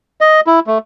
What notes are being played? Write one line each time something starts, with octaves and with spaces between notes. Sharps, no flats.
D#5
E4
A3